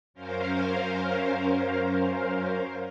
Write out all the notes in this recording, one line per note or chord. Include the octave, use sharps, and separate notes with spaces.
F#2 C#4 A#4 C5 F5